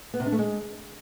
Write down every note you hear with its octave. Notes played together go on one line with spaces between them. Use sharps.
B3
C3
D4
A3
G#3